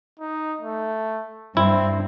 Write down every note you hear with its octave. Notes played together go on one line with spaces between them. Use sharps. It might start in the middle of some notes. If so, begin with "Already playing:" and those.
D#4
A3
G2 C4 E4